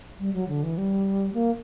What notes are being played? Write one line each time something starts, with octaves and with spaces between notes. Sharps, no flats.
G3
F#3
D3
E3
G3
A#3